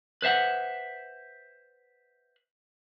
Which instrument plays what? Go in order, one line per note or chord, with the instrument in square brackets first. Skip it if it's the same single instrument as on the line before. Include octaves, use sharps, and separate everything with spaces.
[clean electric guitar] B4 C5 E5 F#5